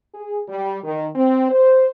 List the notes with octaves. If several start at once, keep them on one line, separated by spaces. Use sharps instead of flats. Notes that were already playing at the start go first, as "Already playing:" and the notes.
G#4
G3
D#3
C4
C5